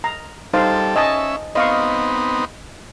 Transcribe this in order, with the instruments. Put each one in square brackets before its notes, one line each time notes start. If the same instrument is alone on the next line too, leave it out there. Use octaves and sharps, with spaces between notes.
[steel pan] A#5
[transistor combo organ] G3 A4 [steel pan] D#4 C5 F5
[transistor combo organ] C#4 E5 [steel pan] D#5 G#5 A5
[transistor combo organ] B3 C4 D#4 [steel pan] D#5 F5 C#6